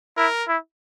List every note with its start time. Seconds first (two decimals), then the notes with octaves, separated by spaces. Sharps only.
0.17 E4 A#4
0.48 E4